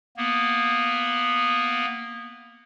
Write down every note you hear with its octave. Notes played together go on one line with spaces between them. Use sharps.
A#3 B3